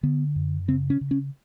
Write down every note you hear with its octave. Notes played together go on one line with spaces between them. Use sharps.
D3 B3
F#2
C#3 C4
C#4
C#3
C#4